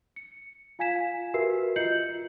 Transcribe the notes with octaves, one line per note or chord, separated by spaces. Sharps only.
C#7
F4 F5 G#5 G#6 B6 E7
F#4 G4 A#4 B4 E5 C7
F4 D#5 G6 C7 C#7 F#7